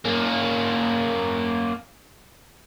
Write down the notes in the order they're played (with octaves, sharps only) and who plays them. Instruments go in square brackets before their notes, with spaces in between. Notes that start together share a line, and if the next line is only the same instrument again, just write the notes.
[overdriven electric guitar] A#3 C#4